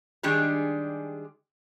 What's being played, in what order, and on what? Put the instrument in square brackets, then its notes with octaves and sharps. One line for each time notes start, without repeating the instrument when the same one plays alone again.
[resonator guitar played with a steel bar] D#3 G3 G#3 D4 G4 G#4